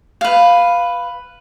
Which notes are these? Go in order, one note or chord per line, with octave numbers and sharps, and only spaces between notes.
B4 F5